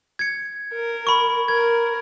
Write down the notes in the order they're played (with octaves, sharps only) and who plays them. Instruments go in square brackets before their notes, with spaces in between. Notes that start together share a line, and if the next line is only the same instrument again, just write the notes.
[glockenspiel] G#6 C#7
[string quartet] A#4
[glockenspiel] B5 C#6
[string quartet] A#4 [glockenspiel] G#6